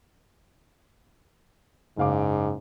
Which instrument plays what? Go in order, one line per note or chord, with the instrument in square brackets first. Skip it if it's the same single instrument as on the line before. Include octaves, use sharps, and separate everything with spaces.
[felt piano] F#1 F5 D6 [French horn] G#2